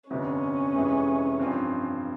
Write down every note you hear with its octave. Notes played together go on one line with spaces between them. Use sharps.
G1 F2 C3 C#4
F1 F2 C3 E3 G#3
G2 F3 C4